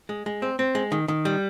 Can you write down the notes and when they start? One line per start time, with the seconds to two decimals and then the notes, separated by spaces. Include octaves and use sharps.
0.09 G#3
0.26 G#3
0.42 C4
0.59 C4
0.75 G#3
0.92 D#3
1.08 D#3
1.25 G3